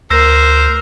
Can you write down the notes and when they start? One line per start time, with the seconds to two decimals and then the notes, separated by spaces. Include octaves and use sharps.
0.11 D2 A#4 C5 E6 A#6 C7